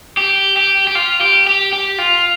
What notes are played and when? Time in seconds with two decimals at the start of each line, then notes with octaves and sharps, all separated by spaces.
0.17 G4
0.57 G4
0.87 G4
0.95 F4
1.21 G4
1.47 G4
1.73 G4
1.98 F4